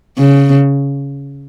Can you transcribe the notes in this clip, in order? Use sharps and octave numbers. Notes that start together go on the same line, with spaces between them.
C#3